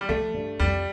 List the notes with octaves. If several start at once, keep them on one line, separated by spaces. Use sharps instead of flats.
G3
F3 A3
G2
F2 G3